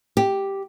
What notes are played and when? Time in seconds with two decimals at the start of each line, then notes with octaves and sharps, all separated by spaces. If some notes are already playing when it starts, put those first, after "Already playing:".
0.17 G4